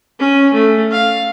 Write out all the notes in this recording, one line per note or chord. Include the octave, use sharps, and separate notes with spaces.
C#4
A3
F5